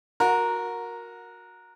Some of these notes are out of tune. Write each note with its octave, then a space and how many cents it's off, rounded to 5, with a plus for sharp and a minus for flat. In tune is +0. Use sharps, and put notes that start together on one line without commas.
F#4 -20 A#4 +0